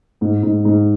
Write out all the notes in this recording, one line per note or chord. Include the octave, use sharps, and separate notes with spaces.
G#2
G#2
G#2